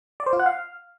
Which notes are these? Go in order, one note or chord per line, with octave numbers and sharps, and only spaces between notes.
D5
C5
F4
F#5
F5